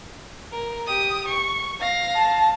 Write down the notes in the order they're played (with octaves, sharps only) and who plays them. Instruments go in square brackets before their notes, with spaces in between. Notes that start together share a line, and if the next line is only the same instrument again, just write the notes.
[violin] A#4
G4 D#6
C#6
F5 A#6
[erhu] A5